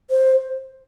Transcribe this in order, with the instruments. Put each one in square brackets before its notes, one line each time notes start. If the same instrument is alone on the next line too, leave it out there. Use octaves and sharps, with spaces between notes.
[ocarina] C5